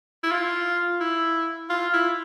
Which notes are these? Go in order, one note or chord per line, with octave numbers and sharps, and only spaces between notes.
E4
F4
E4
F4
E4